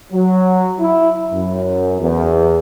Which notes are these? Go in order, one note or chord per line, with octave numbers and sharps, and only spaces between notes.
F#3
E4
F#2
E2